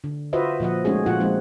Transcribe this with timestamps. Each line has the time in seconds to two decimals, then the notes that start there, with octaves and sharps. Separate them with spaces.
0.04 D3
0.33 F4 F#4 B4 C5 D#5 E5
0.60 A#2 F3 D#5 F#5
0.85 G#3 A3 C#4 D#4 F#4 G#4
1.06 A#2 F3 F4 F#4 F#5
1.20 F3 G#3 C4 D#4